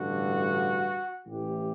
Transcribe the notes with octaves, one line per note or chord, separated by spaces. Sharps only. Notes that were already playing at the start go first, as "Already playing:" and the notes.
Already playing: A1 G2 D3 F#4
A1 A2 E3 G4